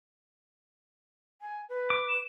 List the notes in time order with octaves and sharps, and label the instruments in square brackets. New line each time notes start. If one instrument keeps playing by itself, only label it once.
[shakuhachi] G#5
B4
[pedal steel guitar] D6
[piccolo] E7